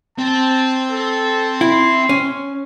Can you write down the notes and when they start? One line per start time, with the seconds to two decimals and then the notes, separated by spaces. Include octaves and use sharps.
0.18 C4 A5
0.91 A4
1.61 E4 C6
2.09 C#4